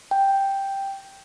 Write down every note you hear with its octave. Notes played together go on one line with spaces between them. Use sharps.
G5